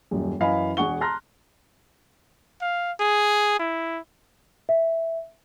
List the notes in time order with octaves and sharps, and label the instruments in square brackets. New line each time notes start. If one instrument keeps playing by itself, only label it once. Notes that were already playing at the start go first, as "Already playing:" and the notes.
[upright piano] D#1 F#2
F#2 E3 D#5 F5 G#5 B5
E1 D4 G#4 F#5 C#6 G7
A5 A#5 C6 F6 F#6 A#6
[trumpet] F5
G#4
E4
[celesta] E5